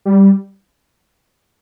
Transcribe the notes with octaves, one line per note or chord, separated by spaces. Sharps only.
G3